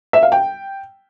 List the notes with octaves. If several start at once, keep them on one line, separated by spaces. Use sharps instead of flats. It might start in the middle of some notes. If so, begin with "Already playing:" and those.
E5
F5
G5